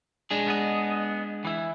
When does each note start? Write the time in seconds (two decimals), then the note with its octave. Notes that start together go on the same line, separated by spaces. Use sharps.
0.31 G#3 D4 G#4
0.48 B3 D#5
1.45 E3 E4